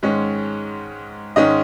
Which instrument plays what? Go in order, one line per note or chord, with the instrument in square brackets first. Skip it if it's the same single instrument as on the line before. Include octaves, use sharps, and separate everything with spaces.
[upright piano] G#2 D#3 G#3 C#4
G#2 D#3 G#3 C#4 D#5